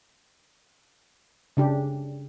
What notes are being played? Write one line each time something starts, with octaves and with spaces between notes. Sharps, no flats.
C#3 D4 G4